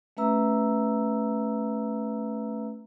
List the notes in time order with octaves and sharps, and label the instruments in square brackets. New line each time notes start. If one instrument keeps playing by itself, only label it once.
[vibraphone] A3 C#4 B4 E5 A#5 E6